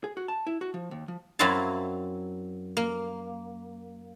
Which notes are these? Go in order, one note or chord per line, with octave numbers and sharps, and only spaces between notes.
G#4
F#4
A5
E4
F#4
F3
D#2
F3
F#2 F#3 C4 E4 F5 A5
A#3